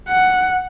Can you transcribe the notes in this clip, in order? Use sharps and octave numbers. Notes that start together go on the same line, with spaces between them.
F#5